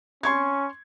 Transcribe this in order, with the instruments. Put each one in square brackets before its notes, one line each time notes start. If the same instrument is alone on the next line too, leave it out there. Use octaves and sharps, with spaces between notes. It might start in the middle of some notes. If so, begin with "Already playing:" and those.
[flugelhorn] C#4 [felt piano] C6 C#6 G#6